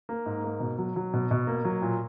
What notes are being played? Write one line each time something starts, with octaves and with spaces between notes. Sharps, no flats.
A#3
G#2
A#3
B2
F#3
F#3
B2
B2
A#3
F#3
A#2